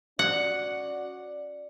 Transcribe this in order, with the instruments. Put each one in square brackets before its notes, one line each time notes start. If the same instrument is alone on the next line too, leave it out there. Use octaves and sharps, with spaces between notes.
[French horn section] C#4 F#4 D5 [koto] F#5